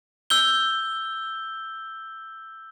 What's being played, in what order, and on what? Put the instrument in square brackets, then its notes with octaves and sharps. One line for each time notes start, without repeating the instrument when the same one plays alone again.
[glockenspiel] E6 G6 G7